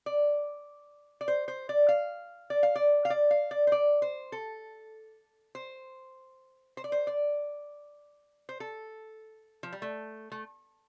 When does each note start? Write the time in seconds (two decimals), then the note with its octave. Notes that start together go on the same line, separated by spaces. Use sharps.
0.06 D5
1.21 D5
1.28 C5
1.48 C5
1.69 D5
1.89 F5
2.50 D5
2.63 F5
2.76 D5
3.05 F5
3.10 D5
3.31 F5
3.51 D5
3.67 C5
3.72 D5
4.02 C5
4.32 A4
5.55 C5
6.77 C5
6.84 D5
6.92 C5
7.07 D5
8.49 C5
8.60 A4
9.63 F3
9.73 G3
9.82 A3
10.32 A3